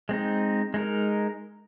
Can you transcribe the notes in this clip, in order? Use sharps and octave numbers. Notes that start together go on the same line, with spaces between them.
G#3 C4 D#4
G#3 D#4 A#4